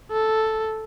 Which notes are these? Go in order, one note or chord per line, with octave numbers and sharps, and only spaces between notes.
A4